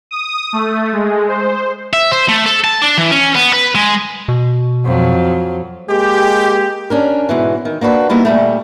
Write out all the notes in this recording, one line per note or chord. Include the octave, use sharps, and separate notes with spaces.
D#6
A3
G#3
C5
E5
C5
A3
A4
A5
D4
E3
C#4
B3
B4
G#3
B2
F2 F#3
G#3 A#3 G4
C#4 D4 A#4
G#2 B2 E3
D#3
A#3 D4 F#4 B4
G3 A#3 B3 D#4 E4 F#4
A#2 G3 A3